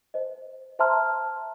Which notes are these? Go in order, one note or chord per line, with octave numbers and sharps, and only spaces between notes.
C5 D#5
C5 E5 A5 A#5 C6 F6